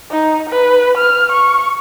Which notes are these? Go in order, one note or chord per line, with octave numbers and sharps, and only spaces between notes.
D#4
B4
F6
C#6